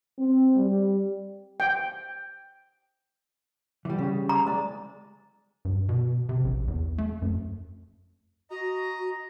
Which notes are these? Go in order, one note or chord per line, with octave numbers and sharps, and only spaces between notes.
C4
G3
G5
E3 G3
C#3 G3
A#5
G#3 D5
G2
B2
C3
A#1
E2
A3
F#2
F#4 D#5 A#5